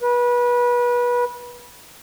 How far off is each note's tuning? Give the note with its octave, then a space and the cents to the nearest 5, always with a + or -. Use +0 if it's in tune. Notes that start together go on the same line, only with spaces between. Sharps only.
B4 -25